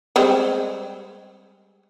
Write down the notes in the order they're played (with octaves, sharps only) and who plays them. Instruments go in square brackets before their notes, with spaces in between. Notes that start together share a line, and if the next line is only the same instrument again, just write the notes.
[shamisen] G3 G#3 C4